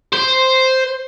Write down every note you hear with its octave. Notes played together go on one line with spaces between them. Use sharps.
C5